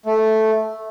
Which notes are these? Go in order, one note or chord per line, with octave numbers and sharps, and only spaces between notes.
A3